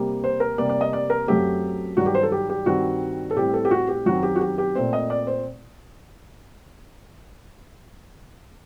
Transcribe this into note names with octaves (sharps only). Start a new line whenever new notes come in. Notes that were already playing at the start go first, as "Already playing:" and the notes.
Already playing: C3 G3 A#3
C5
A#4
C3 G3 A#3 D5
D5
D#5
D5
A#4
F#2 F#3 A3 C4 G4
G2 D#3 F#3 F#4
G4
C5
A4
G4
G4
G2 D#3 G3 C4 F#4
A4
A2 G3 C4 G4
A4
G4
F#4
G4
F#2 D#3 F#3 C4 F#4
G4
F#4
G4
G4
A#2 A3 C4 C5
D#5
D5
C5